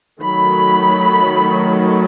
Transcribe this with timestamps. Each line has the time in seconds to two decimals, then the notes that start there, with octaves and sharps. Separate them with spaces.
0.21 D#3 F#3 A3 B5